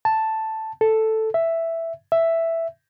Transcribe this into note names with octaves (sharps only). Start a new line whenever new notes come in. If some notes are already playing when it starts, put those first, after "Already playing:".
A5
A4
E5
E5